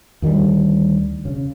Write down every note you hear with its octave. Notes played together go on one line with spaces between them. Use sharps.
D2 D#3 F3 G3
C#3